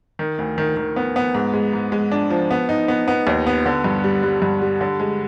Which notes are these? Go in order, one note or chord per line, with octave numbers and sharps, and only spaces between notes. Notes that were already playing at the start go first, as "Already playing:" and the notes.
D#3
D2
D#3
D#3
B3
B3
G#2
G#3
G#2
G#3
D4
F3
B3
D#4
B3
B3
D#2
B3
D3
G2
G3
G3
G2
G3
D3
G#3